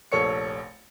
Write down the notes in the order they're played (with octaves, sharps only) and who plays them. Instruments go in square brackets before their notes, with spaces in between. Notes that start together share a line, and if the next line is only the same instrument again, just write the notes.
[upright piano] F1 A#1 A4 C#5 C#6 C#7